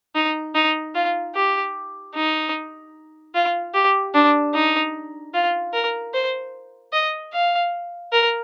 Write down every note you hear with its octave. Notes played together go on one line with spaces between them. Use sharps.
D#4
D#4
F4
G4
D#4
F4
G4
D4
D#4
F4
A#4
C5
D#5
F5
A#4